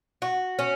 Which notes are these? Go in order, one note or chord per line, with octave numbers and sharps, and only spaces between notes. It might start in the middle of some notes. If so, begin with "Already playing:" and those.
F#4
C#4